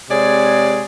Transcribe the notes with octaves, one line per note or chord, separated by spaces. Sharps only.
C3 G#3 G#4 C#5 D5